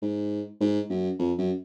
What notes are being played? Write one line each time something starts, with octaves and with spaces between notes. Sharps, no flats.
G#2
G#2
F#2
F2
F#2